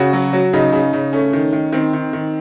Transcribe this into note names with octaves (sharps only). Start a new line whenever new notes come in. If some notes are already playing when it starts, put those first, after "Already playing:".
Already playing: C#3 F#4
F#3
F#3
C#3 D#4
C#3
C#3
A3 C#4
D#3
D#3
D#3 C4
D#3
D#3